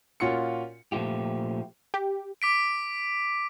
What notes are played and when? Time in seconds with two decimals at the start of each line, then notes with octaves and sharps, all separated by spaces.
0.20 A#2 C#4 F4 F#4 C6 C#7
0.92 A#2 F3 A3 F4 G4
1.94 G4
2.42 D6 B6 D7